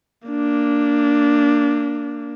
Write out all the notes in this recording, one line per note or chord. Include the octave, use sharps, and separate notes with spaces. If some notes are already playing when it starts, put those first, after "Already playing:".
A#3 D4